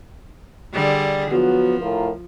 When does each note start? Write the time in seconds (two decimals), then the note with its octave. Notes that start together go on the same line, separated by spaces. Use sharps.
0.73 D3 G3 G#4
1.32 F3 F#3 B3 F#4
1.81 A2 F4 A#4